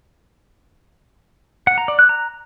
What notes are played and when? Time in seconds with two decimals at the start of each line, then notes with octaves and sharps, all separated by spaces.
1.67 F#5
1.78 A#5
1.88 D5
1.99 F#6
2.09 A#5